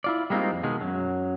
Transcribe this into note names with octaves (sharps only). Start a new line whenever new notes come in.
E4 F4 D5
G3 G#3 A#3 C4 D#4 F4
F2
B2 D#3 G#3
F#2 F#3